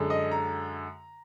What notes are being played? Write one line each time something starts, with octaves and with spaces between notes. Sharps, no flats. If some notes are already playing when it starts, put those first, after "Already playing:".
Already playing: F#2 D3 G#3
D#5
A#5